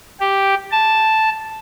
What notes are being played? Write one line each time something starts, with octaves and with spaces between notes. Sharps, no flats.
G4
A5